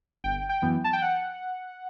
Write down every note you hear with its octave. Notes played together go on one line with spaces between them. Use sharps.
G1 G5
G5
F#2 E3 B3
A5
G5
F#5